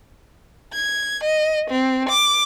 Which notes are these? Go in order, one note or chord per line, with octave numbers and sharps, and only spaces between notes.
G#6
D#5
C4
D6